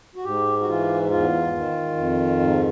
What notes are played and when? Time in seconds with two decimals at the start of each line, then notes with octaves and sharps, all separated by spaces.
0.16 F#4
0.24 G#2 G4
0.61 F#4
0.68 E3 F4
1.10 E2 F4
1.55 D#3
1.97 F2
2.40 G#2